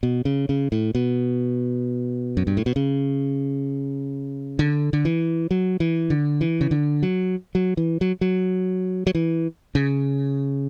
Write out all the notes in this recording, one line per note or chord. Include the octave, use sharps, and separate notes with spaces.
B2
C#3
C#3
A2
B2
F#2
G2
A2
B2
C#3
D3
D3
E3
F#3
E3
D3
E3
C#3
D3
F#3
F#3
E3
F#3
F#3
F#3
E3
C#3